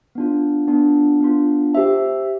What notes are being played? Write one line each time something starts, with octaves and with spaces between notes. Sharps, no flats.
B3 D4 F4
B3 D4 F4
B3 D4 F4
G4 C5 E5 A5